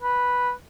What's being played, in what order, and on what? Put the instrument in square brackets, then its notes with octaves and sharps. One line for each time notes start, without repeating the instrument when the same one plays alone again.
[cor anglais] B4